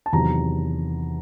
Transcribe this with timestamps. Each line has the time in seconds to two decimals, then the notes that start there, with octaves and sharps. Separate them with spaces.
0.06 A5
0.13 E2 C3 D#3 F#3 A#5